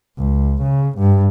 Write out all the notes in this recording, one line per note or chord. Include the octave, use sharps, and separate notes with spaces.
C#2
C#3
G2